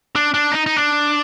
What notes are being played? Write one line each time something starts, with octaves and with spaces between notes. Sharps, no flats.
D4
D4
D#4
D#4
D4